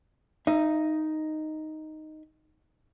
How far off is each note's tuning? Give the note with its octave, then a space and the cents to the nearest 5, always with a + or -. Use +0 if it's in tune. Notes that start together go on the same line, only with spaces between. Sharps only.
D#4 +0 E5 +30